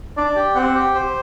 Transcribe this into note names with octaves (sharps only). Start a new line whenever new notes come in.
D4 D5
G4
C4 F#5
G4
C5